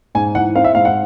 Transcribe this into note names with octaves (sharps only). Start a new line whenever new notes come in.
G#2 G#5
E3 F#5
C4 F5
E5
G#2 F5
F#5